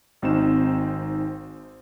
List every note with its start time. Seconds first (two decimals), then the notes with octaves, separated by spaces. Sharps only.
0.22 G#1 C4 D#4 E7